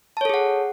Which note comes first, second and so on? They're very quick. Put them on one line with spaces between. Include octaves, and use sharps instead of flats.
A5 C#5 A4 G#4 F#5